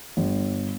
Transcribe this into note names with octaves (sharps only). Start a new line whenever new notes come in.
G1